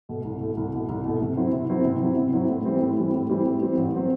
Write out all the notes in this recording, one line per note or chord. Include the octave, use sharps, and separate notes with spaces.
B2 A3
C2
B2 A3
C2
B2 A3
C2
B2 A3
C3
F#3 C4 E4
C3
F#3 C4 E4
C3
F#3 C4 E4
C3
F#3 C4 E4
A2
E3 G3 C4
A2
E3 G3 C4
A2
E3 G3 C4
A2
E3 G3 C4
A1
F#3 C4